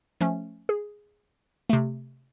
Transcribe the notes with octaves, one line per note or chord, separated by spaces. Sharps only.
F3 A3 C#4
G#4
C3 A3